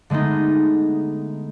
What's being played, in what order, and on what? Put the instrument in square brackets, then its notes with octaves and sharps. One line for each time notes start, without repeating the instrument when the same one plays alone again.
[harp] D3 G#3 A3 B3 D#4